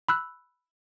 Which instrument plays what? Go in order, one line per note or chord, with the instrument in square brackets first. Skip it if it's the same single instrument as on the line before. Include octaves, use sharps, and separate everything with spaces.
[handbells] B5 E6 F#6